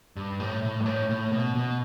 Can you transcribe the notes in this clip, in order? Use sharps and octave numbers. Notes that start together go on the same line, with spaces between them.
G2
A2
A2
G2
A2
A2
B2
B2